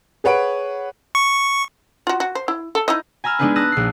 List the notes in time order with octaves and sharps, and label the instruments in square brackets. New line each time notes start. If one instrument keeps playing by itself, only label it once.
[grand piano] G#4 B4 C#5 F#5 D7
[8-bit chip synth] C#6
[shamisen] F4 F#4
F#4
C5
E4
A4
D#4 E4 D#5
[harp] G#5 A#5 B5 E6 F6
G#3 B3 D4 D#4 G#4 B4
A5 D#6 E6 F#6 A#6
A#1 C7